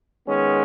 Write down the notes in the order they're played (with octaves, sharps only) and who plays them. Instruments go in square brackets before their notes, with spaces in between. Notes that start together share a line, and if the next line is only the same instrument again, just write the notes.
[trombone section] D#3 G#3 B3 C#4